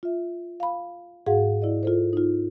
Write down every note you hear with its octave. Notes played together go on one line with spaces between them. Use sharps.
F4 E5
F5 B5
G#2 F#4 G#4 F5 F#5
E4 D5 D#5
F4 A4 C5
D#4 F4